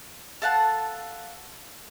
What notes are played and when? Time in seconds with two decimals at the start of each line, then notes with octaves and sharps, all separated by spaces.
0.42 A4 F5 F#5 A5